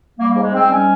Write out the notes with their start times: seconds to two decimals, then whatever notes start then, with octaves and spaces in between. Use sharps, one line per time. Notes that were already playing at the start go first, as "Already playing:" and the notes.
0.19 G3 A#3
0.31 A#3
0.36 G#2
0.42 G#3
0.53 G#2 C4
0.70 G3 C#4